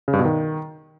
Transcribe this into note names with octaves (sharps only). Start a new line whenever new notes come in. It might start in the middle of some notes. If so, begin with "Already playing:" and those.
C#3
G2
B2
D#3